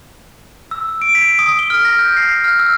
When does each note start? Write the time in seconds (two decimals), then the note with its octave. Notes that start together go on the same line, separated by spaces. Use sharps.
0.71 E6
1.02 D7
1.15 B6
1.39 D#6
1.59 G7
1.70 F6
1.85 A#6
1.99 G6
2.17 C7
2.44 F6
2.59 E6